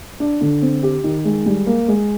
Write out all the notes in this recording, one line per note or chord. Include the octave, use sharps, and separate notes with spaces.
D4
D3
C4
G4
D#3
G#3
G3
A#3
G#3